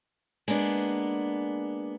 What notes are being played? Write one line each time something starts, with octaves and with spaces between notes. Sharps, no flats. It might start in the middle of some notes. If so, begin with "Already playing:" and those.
G#3 A#3 B3 D4 G#4